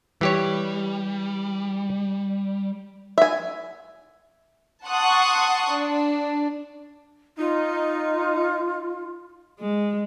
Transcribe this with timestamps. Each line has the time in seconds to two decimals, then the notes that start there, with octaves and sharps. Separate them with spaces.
0.21 E3 G3 G4 C#5
3.18 E5 G#5
4.85 F#5 A5 C6 C#6 D#6 F#6
5.71 D4
7.38 D#4 F4
9.60 G#3